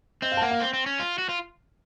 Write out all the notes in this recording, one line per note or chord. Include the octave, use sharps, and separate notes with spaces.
C4 D#5
F5
A5
A#3 F#5
F5
C4
C4
C#4
F4
F#4
F4